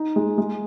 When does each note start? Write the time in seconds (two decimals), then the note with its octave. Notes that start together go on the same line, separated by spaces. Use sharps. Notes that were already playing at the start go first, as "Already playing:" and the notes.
Already playing: D#4
0.16 G#3
0.38 G#3